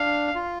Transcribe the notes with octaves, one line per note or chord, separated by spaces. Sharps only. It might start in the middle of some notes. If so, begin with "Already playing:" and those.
Already playing: D4 F5
F4